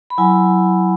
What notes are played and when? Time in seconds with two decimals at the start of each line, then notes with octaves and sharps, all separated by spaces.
0.10 B5
0.18 F#3 E4 G#5